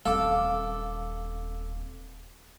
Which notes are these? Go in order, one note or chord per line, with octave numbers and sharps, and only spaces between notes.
D#1 C4 A4 F5 D6